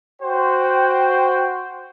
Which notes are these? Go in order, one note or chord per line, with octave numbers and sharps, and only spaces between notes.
F#4 C5 G5